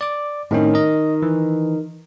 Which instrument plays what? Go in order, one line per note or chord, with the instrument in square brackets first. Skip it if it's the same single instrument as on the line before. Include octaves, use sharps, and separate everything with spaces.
[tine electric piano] D5 D6
[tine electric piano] A2 C4 C#4 [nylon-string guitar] D#3
[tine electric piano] A#4 D#5
E3